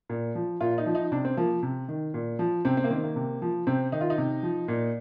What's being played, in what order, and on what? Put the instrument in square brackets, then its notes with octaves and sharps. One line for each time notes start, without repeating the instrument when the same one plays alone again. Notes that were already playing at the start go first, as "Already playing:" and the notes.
[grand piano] A#2
F3
A#2 F4
D#4
F3
D#4
C3 D4
C4
F3 A#3
C3
D#3
A#2
F3
C3 C4
C4
A#3
D#3 C4
A#3
C3
F3
C3 C4
D#3 D#4
F4
D#4
C3
F3
A#2